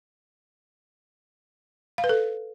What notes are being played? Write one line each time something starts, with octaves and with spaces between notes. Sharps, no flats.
F5
B4
A4